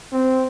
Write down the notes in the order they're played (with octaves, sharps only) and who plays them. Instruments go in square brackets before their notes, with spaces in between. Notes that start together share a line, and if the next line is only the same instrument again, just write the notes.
[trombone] C4